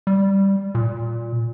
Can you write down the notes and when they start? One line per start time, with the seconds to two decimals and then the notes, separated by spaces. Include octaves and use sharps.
0.07 G3
0.75 A#2